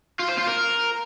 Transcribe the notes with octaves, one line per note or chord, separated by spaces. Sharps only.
F4
C5
F4
A#4